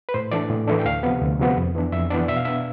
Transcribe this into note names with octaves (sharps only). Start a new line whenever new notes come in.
B4
A2 C5
E3 A3 D4 D5
A2
E3 A3 D4
G5
D2 F5
C3 F3 B3
D2
C3 F3 B3
F2
E3 B3 D4
F2 E5
E3 B3 D4 D5
B2 E5
F5
B3 D4 E5